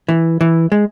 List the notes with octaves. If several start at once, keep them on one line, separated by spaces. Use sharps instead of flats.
E3
E3
G#3